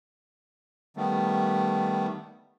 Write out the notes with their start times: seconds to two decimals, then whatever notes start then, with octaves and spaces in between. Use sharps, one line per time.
0.97 D#3 G3 A3 B3